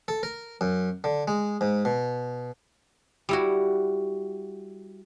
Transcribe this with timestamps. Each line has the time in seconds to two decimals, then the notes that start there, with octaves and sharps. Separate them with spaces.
0.08 A4
0.23 A#4
0.61 F#2
1.04 D3
1.28 G#3
1.61 G#2
1.85 B2
3.29 G3 E4 F#4